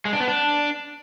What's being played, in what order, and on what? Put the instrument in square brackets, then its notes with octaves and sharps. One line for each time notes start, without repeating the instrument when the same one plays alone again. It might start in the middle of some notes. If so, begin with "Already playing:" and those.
[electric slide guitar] G#3
D4
B3
D4